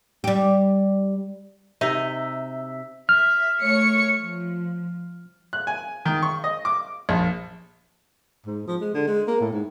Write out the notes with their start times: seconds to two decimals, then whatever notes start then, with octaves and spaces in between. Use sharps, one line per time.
0.24 G3 G4
1.81 C3 D#4 E5
3.09 E5 F6
3.61 A3 C#5 C#7
4.17 F3
5.53 F#6
5.67 G#5
6.05 D#3
6.22 C#6
6.44 D#5
6.65 D6
7.09 A#1
8.46 G#2
8.68 F3
8.81 G#3
8.94 D3
9.08 G#3
9.28 A#3
9.41 A2
9.53 G#2